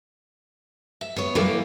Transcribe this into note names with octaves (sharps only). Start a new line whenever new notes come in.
E5
B3 C#5
E3 F#3 G3 A#3 A4 B4